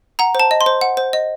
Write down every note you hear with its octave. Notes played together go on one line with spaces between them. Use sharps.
F#5 A#5
C5 A5
D#5
C6
C5
F#5
C5
D#5